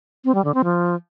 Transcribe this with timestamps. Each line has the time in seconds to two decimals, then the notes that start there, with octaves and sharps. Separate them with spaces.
0.25 C4
0.35 G3
0.44 D3
0.54 C4
0.64 F3